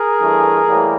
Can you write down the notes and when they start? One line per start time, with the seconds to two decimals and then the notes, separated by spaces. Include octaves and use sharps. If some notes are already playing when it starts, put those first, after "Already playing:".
Already playing: G#4 A#4
0.19 G2 E3 A3
0.68 A2 E3 G3 A#3